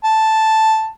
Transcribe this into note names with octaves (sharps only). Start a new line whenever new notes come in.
A5